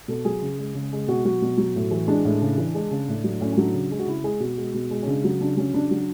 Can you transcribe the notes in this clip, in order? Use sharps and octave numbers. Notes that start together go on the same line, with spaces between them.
B2 A4
F#3 G#4
C#3
G#3
C#3
G#3
B2 F#4
F#3 F#4
B2
F#3
A2
E3
G#3 D4
A2
C#3
E3
G#3
C#3
A2
F#3
A2 C#4
C#4
F#3 D4
C#3
G#3
F#4
C#3 E4
G#3 G#4
B2 F#4
G#3
B2
G#3
C#4
C#3 D4
F#3 F#4
C#3 D4
F#3 C#4
C#3 D4
F#3